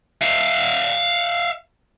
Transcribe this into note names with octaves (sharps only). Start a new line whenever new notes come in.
E5 F5